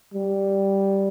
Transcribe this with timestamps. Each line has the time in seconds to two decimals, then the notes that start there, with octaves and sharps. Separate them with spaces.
0.14 G3